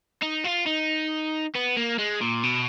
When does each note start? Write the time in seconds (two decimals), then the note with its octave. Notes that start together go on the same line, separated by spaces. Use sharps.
0.23 D#4
0.44 F4
0.66 D#4
1.55 B3
1.77 A#3
1.99 G#3
2.21 A#2
2.43 B2